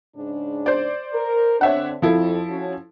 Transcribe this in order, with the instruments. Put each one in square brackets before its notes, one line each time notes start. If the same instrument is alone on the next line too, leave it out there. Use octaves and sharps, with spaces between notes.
[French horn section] G#2 C#3 D4
[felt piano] C5 D5
[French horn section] A#4
[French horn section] D3 C4 D4 [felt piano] C#5 E5 F#5
[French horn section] F2 [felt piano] F3 E4 A4
[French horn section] C#4 F#4